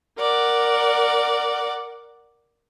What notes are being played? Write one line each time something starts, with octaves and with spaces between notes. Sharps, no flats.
A#4 D5 F#5